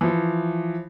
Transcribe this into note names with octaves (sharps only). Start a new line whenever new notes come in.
E3 F3